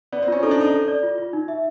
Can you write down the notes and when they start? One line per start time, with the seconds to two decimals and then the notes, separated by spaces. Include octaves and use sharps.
0.12 B3 D5
0.22 C4
0.28 C#4 F4
0.43 D#4 A4
0.51 D4
0.58 D#4 A4
0.73 A4
0.88 D5
1.03 F4
1.18 F4
1.33 D#4
1.48 E5